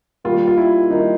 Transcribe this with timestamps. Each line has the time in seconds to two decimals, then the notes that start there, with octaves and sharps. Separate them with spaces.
0.24 D#3 G3 A#3 F4
0.47 F4
0.58 E4
0.90 D#3 G3 A#3 D#4